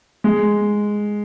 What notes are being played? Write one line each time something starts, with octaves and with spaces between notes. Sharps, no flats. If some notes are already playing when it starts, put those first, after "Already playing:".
G#3